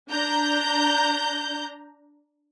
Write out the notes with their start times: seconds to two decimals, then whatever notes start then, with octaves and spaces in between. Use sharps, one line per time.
0.10 D4 A#5 G6